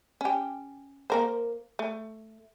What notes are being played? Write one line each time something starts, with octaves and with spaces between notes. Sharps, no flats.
C#4 G4
A#3 A#4 C5
A3